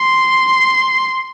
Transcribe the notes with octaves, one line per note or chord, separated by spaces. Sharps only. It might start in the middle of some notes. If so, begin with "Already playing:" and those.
Already playing: C6